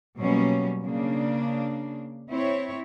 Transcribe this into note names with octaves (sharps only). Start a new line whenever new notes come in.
B2 F#3 G3 A#3 C#4
C#3 A#3 D4
C4 E4 C#5